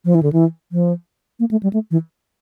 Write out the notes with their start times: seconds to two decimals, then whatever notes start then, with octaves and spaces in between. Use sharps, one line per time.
0.05 F3
0.15 E3
0.23 D3
0.33 E3
0.72 F3
1.40 A#3
1.51 A3
1.63 G3
1.73 A3
1.91 E3